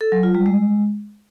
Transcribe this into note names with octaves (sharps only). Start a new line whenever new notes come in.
A4
F#3
F4
G3
G#3